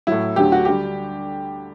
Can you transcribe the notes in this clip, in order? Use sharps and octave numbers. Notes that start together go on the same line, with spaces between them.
A2 F#3 E4
D2 D3 F#3 G4
F#4
D3 G3 G4